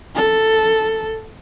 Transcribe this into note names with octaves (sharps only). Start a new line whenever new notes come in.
A4